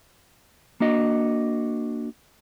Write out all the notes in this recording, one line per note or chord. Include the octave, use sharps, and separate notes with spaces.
A#3 D4 F#4 D#5